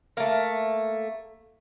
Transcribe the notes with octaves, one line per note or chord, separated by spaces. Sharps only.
A3 A#3